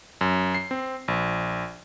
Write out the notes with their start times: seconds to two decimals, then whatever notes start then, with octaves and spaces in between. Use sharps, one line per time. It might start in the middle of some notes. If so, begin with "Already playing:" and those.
0.21 F#2
0.55 C7
0.71 C4
1.08 A#1